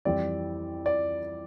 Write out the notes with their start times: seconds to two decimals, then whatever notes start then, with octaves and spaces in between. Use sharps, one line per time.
0.05 F2 E3 G3 C4 D5
0.86 D5